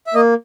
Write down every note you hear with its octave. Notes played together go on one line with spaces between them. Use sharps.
E5
A#3 D#5